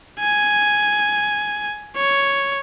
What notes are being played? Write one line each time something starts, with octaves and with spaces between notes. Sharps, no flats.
G#5
C#5